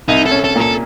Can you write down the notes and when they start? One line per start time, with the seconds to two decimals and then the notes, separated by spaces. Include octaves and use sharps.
0.08 C2 D#4
0.26 A4
0.31 C#4
0.44 A4
0.55 A#2
0.61 A4